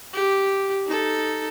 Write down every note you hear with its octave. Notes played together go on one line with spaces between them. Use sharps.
G4
D#4 A4